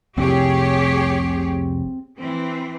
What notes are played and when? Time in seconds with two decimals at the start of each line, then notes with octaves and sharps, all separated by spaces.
0.18 F1 C2 C4 G4 G#4 C#5
2.19 E3 C4